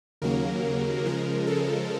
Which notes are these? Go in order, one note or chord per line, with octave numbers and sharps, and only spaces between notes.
D#2 C#3 F#3 A#3 A#4
C#3 F3 G#3 A#4
A4